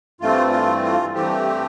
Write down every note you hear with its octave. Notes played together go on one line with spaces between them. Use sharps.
G2 E3 A3 C4 F4
F4
F4
G2 E3 A3 C4 G4